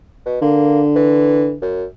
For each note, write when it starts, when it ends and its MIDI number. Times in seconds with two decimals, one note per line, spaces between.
0.26 0.40 47
0.42 1.55 50
0.42 0.81 58
0.96 1.53 52
1.62 1.84 42